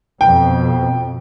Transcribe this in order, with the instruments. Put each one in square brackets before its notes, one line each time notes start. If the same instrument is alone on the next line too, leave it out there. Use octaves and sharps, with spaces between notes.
[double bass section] F2 B2 [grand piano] G5